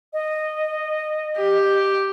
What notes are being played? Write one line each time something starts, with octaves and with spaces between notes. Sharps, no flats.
D#5
G4